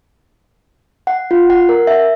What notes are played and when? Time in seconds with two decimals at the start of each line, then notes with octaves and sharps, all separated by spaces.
1.07 F#5
1.31 F4
1.50 F#5
1.69 A#4
1.87 E5